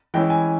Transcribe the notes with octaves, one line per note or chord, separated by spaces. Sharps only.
E3 G#3 C#4 E4 G5
G#5